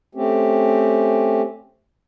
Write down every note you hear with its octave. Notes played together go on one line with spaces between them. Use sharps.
A3 C4 C#4 G4